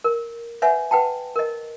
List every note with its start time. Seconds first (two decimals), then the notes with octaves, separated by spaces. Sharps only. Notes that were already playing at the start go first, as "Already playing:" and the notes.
0.04 A#4
0.62 B4 C#5 E5 F#5 G#5
0.91 B4 F#5 G5 A5
1.36 A#4 D#5